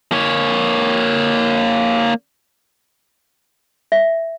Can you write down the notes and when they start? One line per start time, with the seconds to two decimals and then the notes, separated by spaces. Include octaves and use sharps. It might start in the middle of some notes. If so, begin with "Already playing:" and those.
0.12 A#3 C#5
3.92 E5